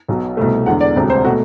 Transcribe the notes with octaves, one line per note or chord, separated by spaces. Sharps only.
B1 B2 F#3
C2 B2 A3
E1 E2 D3 F#5
D5
E1 D2 C3 G3
C5
B2 A3 F#4